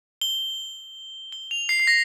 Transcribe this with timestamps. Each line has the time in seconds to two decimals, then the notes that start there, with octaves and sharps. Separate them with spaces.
0.21 G7
1.32 G7
1.51 F7
1.69 C7
1.80 C7
1.87 A#6